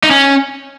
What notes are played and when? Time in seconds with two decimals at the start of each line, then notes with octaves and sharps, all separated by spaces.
0.03 D#4
0.11 C#4